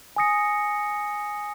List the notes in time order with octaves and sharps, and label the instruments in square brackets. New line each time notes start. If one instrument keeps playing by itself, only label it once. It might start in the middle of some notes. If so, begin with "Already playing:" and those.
[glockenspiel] G#5 D#6 A#6 C#7